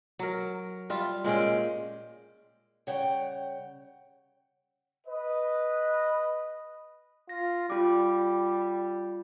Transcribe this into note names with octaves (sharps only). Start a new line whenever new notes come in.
F#3 A#4
G3 F4 E5
A#2 G#3 C#4 G5
C#3 G3 C#5 F#5 G5
B4 D#5
F4 A#6
G3 F4 D6